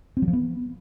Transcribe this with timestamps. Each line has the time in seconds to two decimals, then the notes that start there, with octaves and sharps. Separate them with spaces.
0.17 C4
0.22 F#3
0.28 F3
0.33 B3